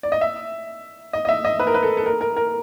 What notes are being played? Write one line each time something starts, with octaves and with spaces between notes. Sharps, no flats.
D5
D#5
E5
D#5
D#5
E5
D#5
B4
A#4
B4
A4
A4
A#4
A#4
A#4